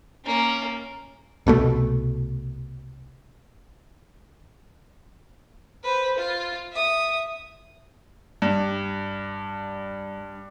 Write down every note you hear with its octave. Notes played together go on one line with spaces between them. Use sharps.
A#3 C#4
C2 B2 F#3 A3
B4 C5
F4
E5 D#6
G2 G3